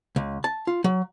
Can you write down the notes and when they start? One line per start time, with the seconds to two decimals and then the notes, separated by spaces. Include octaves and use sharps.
0.16 C#2
0.44 A5
0.67 F4
0.84 F#3